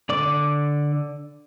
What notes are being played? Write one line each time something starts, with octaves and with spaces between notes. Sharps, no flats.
D3 D5 D6